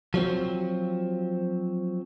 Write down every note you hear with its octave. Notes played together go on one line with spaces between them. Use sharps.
F3 F#3 C4